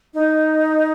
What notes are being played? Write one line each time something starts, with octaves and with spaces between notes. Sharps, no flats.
D#4